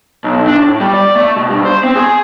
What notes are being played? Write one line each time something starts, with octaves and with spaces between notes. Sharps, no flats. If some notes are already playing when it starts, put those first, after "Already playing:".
B1
D4
A2
G3
D5
A3
B2
G2
C5
C4
G#4